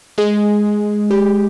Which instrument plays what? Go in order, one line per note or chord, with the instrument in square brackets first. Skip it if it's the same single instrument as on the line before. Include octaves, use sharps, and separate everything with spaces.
[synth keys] G#3 G#4
G4